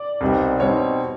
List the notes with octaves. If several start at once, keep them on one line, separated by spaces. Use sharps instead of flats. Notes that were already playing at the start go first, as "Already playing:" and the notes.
Already playing: D5
C2 B2 G3 C4 D#4
B2 G3 C4 D#4 C#5